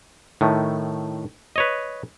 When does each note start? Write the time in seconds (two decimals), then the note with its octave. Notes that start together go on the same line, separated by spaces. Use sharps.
0.41 A2 D#3 A3
1.56 B4 C#5 D#5